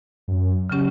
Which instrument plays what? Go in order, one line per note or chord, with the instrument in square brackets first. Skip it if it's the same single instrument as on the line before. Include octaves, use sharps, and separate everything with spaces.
[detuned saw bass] F#2
[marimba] C#3 F#3 C#4 G4